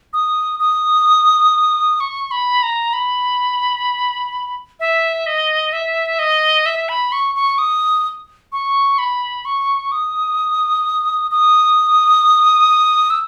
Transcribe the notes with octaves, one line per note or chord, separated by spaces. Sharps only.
D#6
D#6
C#6
B5
A#5
B5
E5
D#5
E5
D#5
E5
B5
C#6
C#6
D#6
C#6
B5
C#6
D#6
D#6
E6